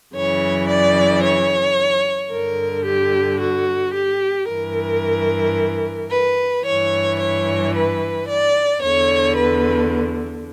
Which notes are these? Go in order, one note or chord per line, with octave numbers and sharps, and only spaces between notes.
F#2 C#3 E3 C#5
D5
C#5
G2 D3 A#4
G4
F#4
G4
G2 E3 A#4
B4
G2 E3 C#5
C#5
B4
D5
E2 D3 C#5
B4